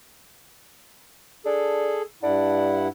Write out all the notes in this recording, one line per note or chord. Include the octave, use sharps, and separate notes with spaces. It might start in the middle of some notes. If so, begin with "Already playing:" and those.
D4 G#4 A4
G2 D4 E4 F#5